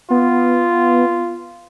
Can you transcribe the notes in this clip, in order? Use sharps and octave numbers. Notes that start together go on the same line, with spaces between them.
B3 F4